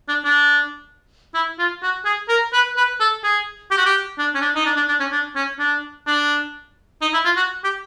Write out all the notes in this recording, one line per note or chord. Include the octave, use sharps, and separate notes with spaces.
D4
D4
E4
F4
F#4
G#4
A#4
B4
B4
A4
G#4
G4
F#4
G4
D4
C#4
D4
D#4
D4
D4
D4
C#4
D4
C#4
D4
D4
D#4
E4
F4
F#4
G4